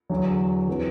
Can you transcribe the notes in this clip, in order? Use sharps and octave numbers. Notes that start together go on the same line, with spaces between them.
E2 D3 F#3
F#3 C4 E4 B4